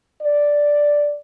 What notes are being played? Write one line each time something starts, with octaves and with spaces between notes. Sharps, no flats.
D5